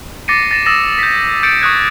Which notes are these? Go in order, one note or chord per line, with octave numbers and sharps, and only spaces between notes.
D6 A6 A#6 C7 C#7 D#7
A6 A#6 E7
D#6 E6 A6 A#6 E7
G6 B6
G6 A6 C#7 D7
C#6 D#6 F#6 G#6